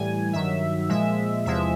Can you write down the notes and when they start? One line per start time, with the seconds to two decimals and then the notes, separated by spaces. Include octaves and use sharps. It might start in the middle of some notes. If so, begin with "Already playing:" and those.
Already playing: A2 E3 G3 G#5
0.33 G2 D#3 F#3 E5
0.89 A#2 F3 G#3 E5
1.46 E2 C3 F3 G#3 E5